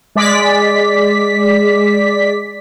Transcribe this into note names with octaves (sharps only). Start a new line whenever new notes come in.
G#3 D5 B6